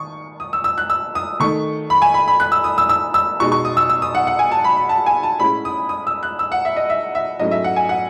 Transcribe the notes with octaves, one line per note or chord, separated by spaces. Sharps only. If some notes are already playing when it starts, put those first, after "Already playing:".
Already playing: D#3 C#6 D#6
D#6
E6
E6
F#6
E6
D#6
D#3 A3 D#4 C#6
B5
G#5
B5
B5
F#6
E6
D#6
E6
E6
E6
B2 G#3 D#4 C#6
C#6
D#6
E6
E6
D#6
F#5
F#5
G#5
A5
B5
B5
A5
G#5
A5
A2 G#3 C#4 E4 B5
D#6
D#6
E6
F#6
E6
F#5
E5
D#5
E5
E5
G#2 F#3 A3 C#4 E4 D#5
E5
F#5
G#5
F#5